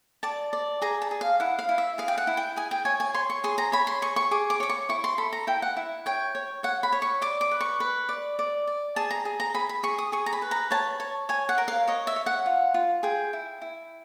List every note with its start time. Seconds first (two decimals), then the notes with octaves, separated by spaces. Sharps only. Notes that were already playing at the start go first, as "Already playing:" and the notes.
0.23 D5 A5
0.53 D5
0.82 G#4 A#5
1.02 A5
1.11 G#4
1.21 F5
1.40 E4 F#5
1.59 F5
1.69 E4
1.78 E5
1.98 G#4 F5
2.08 G5
2.18 F#5
2.27 E4
2.37 G5
2.56 G#4 G#5
2.71 G5
2.85 C#5 G#5
3.00 G#5
3.14 C#5 C6
3.30 C#6
3.44 G#4 C6
3.58 A#5
3.72 C#5 B5
3.87 C6
4.02 G#4 C#6
4.16 C#6
4.31 G#4 D6
4.50 D6
4.60 C#5 D6
4.69 C#6
4.89 E4 C#6
5.04 C6
5.18 A4 B5
5.33 A#5
5.47 E4 G5
5.62 F#5
5.77 E4
6.06 C#5 G5
6.35 C#5
6.63 C#5 F#5
6.83 B5
6.92 C#5
7.02 C#6
7.22 D5 D6
7.41 D6
7.51 B4
7.61 C#6
7.80 B4
8.09 D5
8.39 D5
8.67 D5
8.96 G#4 A5
9.11 A#5
9.25 G#4
9.40 A#5
9.54 G#4 B5
9.69 B5
9.83 G#4 C#6
9.98 D#6
10.12 G#4 C#6
10.26 A#5
10.33 B5
10.42 B4
10.51 A#5
10.71 C#5 A5
11.00 C#5
11.29 C#5 G#5
11.49 F#5
11.58 A#4
11.68 F5
11.88 C#5 D#5
12.07 E5
12.16 C#5
12.26 F#5
12.46 F4
12.74 F4
13.03 G#4 G5
13.33 E4
13.62 E4